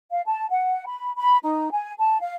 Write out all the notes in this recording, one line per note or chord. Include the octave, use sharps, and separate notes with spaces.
F5
A5
F#5
B5
B5
D#4
G#5
A5
F5